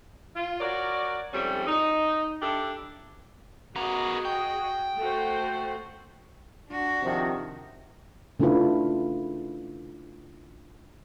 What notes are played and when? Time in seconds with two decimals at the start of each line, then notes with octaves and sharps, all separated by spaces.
0.36 F4
0.60 F#4 A#4 C#5 D5
1.33 F2 G#2 G3 A3 C4 C#4
1.67 D#4
2.42 D4 E4 G4 A4
3.76 B3 F#4 G#4 A#4 D#5
4.25 G5
4.97 A3 F#4 C5
6.69 D4 F#4
7.02 C3 D#3 F3
8.40 C#3 A3 D4 E4 F4 B4